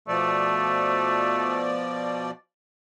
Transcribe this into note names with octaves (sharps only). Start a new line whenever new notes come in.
B2 F3 A3 D5